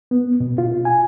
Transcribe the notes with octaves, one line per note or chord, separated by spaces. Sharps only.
B3
B2
F4
G#5